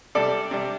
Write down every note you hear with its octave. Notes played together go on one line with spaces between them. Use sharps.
C3 G3 D4 A4 D5
C3 G3 D4